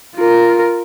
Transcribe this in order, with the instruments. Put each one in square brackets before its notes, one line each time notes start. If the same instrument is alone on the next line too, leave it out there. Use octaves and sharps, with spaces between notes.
[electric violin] F4 A#4